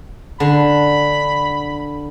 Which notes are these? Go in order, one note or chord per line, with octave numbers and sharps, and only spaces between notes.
D3 B5